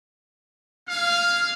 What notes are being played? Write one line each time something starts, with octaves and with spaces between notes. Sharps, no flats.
G#4 F5 F6